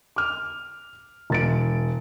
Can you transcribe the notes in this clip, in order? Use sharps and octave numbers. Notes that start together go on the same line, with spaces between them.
D6 F6
E1 A6 D7